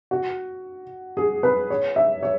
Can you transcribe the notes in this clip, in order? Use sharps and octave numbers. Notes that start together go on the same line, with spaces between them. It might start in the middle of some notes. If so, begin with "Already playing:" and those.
F#4
G#4
B4
C#5
E5
C#5